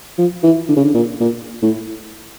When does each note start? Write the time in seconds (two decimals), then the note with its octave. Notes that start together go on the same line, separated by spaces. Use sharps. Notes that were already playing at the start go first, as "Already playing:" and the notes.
0.18 F3
0.43 E3
0.69 D3
0.76 C#3
0.85 D3
0.94 A#2
1.20 A#2
1.62 A2